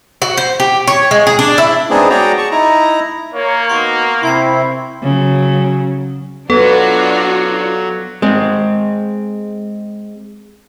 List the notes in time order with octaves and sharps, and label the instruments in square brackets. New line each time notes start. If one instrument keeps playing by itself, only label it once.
[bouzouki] F#4
C5
G4
C#5
G#3
G#4
D4
E4
[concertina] G#3 B3 C4 D4 D#4 G#4
F#4 G#4 C#5 D5 G5 A#5
A5 C#6
D#4 E4 A#5
[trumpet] A#3 [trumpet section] A#4 C#5
[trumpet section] B3 D#4 F#4 [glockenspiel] C6 C#6
[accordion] C3 E4 [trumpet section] C4 [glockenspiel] C6 G#6 C7
[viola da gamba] C#3 F#3
[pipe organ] F#3 [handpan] B3 [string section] D4 F4 F#4 [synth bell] A4
[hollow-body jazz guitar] G#3 C4